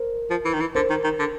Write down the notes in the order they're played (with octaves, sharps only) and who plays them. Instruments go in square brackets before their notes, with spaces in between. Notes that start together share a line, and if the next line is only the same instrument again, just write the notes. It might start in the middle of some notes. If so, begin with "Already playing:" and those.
Already playing: [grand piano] A#4 C5
[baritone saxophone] F3
E3
D#3
E3
[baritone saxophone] D3 [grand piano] A#4 C5
[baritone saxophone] D#3
D#3
D3